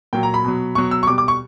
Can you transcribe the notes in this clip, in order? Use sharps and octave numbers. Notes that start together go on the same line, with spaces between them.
A#2 F#3 G5
A#5
B5
B2 F#3
B2 F#3 C#6
E6
C#6
B2 G3 D6
D6
C#6